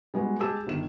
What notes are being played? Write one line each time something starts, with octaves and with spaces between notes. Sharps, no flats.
G3 G#3 B3 F#4
G#3 G4 G#4 A5 E6 E7
G1 D#3 E7